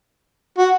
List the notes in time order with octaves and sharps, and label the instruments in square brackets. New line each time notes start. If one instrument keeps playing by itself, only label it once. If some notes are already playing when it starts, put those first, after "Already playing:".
[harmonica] F#4